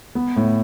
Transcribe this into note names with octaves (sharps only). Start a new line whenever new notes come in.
B3
A2